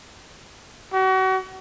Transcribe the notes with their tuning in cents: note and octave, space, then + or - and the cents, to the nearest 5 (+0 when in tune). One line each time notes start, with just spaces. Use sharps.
F#4 +35